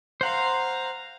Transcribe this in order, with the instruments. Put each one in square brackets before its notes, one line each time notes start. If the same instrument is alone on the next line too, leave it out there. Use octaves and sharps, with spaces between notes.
[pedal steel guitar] C5 F#5 C6 [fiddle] F5 A#5